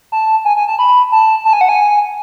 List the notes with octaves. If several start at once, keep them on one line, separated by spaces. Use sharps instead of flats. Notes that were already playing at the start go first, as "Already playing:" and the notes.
A5
G#5
G#5
A5
B5
A5
A5
G#5
F#5
G#5